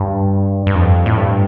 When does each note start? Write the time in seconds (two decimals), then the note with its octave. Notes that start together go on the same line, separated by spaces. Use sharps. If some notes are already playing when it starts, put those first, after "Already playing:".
Already playing: G2
0.67 G2
0.75 F2
1.06 A2
1.17 G2